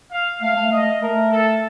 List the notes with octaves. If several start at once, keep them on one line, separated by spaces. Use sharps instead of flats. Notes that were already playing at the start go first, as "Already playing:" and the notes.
F5
A3 F5
A3
A3 D#5
A3 A#4
A4